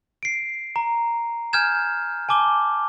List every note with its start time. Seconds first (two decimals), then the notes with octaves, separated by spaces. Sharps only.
0.23 C7 D7
0.76 A#5
1.53 G#5 F6 G6 G#6 E7
2.29 G#5 A5 D6 G7